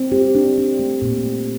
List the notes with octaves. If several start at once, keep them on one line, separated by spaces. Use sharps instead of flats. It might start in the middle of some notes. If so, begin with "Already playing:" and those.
Already playing: C4
G4
D4
D4
A3
A#2
A3